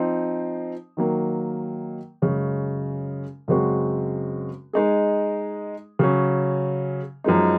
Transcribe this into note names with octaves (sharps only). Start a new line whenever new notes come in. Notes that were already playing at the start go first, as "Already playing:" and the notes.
Already playing: F3 C4 D#4
D#3 F#3 A#3
F#2 C#3 G#3 C#4
F#2 C#3 G#3 C4 F#4
G#3 D#4 G#4
C#3 F#3 C#4
F#2 F3 G#3 D#4